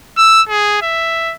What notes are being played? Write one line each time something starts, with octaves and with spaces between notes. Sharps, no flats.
E6
G#4
E5